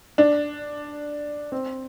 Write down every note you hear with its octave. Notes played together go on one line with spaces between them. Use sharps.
D4
C4